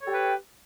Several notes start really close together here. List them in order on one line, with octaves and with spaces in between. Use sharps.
C#5 A4 G4 G5 B4